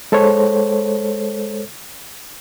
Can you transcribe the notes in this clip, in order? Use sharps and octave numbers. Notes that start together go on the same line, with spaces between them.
G#3 A4 C5 C#5